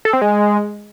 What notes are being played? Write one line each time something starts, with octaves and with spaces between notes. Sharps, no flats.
A4
C4
G#3